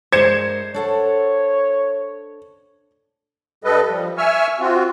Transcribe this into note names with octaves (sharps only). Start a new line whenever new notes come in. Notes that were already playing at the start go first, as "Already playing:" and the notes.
G2 G#3 A#4 C5 G#6 C#7 E7
D4 A4 C#5 F#5
G2 G3 A4 B4 D#5
F3 G3
E5 G#5 C#6 E6 F6
C4 F4 F#4